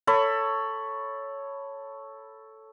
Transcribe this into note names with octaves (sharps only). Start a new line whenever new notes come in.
A4 C#5 B5 C#6